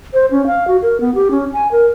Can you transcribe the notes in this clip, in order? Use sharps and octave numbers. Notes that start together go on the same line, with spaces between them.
C5
C#4
F5
F#4
A#4
B3
G4
C#4
G#5
A#4